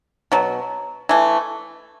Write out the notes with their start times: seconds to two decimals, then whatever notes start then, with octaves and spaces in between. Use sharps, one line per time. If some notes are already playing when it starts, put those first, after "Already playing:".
0.32 B2 F#3
1.09 E3 A3